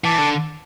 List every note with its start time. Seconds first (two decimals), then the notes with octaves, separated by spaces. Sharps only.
0.04 E3 A5 D6
0.18 D3